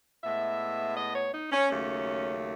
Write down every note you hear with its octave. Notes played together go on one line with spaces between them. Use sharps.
A2 G#3 B3 E5
D#5
C#5
D#4
C#4
D#2 C#3 F#3 A3 C#4